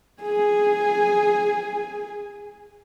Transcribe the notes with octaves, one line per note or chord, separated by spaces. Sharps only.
G#4 G#5